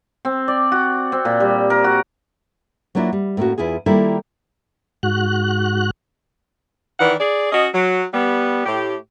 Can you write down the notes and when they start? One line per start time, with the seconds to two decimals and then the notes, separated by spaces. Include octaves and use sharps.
0.25 C4
0.48 D5
0.72 F#4
1.12 C4
1.25 A#2
1.40 G3
1.70 A#4
1.84 F#4
2.95 F#3 A#3 D4 E4 F4
3.13 G3
3.37 A2 A#3 C#4 F#4
3.58 E2 E4 F4 G#4
3.86 D#3 G3 A#3 E4 F4 A4
5.03 G#2 F#4 F#6
7.00 D#3 E3 D5 F#5
7.19 G#4 D5
7.52 C#4 F#4 D#5
7.73 F#3
8.13 G3 B3
8.65 A2 G4